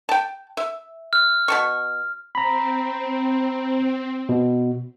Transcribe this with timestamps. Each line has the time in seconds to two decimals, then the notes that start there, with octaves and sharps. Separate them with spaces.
0.09 G5 A5
0.57 E5
1.13 F6
1.48 B2 A5 C#6
2.35 C4 A#5 B5
4.29 B2